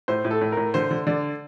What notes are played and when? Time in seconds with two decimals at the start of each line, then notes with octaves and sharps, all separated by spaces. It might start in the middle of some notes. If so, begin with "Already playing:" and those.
0.08 A2 C5
0.25 A2
0.31 A4
0.41 A2
0.52 A2 A#4
0.74 D3 C5
0.91 D3
1.07 D3 D5